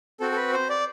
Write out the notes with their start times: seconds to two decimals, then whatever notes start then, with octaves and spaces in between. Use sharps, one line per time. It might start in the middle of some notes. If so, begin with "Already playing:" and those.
0.20 C4 F#4 A4
0.32 A4
0.36 B4
0.53 C5
0.70 D5